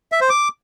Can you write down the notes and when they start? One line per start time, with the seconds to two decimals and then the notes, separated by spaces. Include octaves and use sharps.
0.12 E5
0.21 C5
0.30 D6